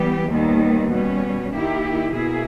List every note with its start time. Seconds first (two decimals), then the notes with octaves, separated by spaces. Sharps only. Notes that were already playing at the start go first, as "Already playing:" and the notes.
Already playing: E3 G3 B3 G4
0.28 D#2 D#3 G3 B3
0.89 B2 G3 C#4
1.52 D#3 A#3 E4 G4
2.12 B2 A#3 E4 G#4